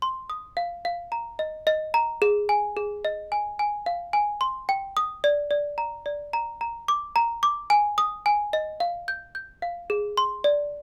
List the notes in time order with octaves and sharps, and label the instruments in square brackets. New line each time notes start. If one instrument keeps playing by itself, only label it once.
[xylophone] C6
D#6
F5
F5
A#5
D#5
D#5
A#5
G#4
G#5
G#4
D#5
G#5
G#5
F5
G#5
C6
G5
D#6
D5
D5
A#5
D5
A#5
A#5
D6
A#5
D6
G#5
D#6
G#5
D#5
F5
G6
G6
F5
G#4
C6
D5